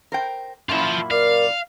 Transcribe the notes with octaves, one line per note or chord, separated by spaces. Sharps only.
A#4 C5 G5
F#2 A#2 E4 F4 A5
A#4 D5 F5